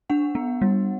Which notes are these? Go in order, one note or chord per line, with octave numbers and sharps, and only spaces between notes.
D4 F#5
B3
G3